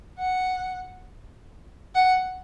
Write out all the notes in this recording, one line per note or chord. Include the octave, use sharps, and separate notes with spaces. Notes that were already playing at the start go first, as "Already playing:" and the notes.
F#5
F#5